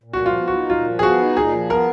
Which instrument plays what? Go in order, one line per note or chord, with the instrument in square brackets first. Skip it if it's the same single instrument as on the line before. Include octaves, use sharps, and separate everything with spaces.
[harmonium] A#2
[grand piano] F#4
[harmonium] F3
[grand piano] F4
[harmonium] B3
[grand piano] F#4
[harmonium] D#4
[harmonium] A#2 [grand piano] F4
[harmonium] F3
[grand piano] G#4
[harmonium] B3 [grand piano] F#4
[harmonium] D#4
[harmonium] A#2 [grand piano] G#4
[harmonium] F3
[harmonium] B3 [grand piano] A#4